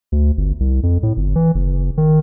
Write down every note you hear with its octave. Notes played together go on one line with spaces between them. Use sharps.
D2
G1
C2
F2
A2
G1
E3
F#1
D#3